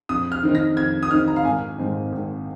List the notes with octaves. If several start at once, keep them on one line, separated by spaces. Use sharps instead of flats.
F2 D#6
F6
D#3 C4 D#4
A#6
F2 G#6
D#6
D#3 C4 D#4 F6
A#5
F5
G#1 G#5
G#2 D#3 C4 D#4
G#1